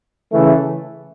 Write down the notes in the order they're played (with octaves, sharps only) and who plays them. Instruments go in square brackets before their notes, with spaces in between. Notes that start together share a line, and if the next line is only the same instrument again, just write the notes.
[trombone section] C#3 E3 A3